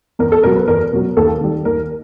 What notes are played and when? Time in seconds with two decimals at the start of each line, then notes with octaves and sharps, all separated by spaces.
0.19 E2 A#4
0.32 A4
0.43 B2 F#3 A#4
0.56 B4
0.68 E2 A#4
0.93 B2 F#3
1.17 D#2 A4
1.41 D#3 G3
1.65 D#2 A#4